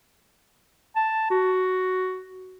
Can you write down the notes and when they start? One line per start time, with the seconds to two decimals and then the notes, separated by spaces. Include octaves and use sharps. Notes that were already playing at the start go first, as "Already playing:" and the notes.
0.96 A5
1.31 F#4